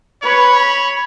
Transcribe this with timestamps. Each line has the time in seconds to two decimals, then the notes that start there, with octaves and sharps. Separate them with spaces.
0.22 B4 C#5
0.55 B5